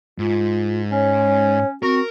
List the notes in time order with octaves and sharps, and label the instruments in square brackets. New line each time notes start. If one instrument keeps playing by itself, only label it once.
[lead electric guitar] G#2 [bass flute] F4
[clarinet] C#4 [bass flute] C#5
[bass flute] C4 [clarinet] F#4 [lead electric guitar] A#4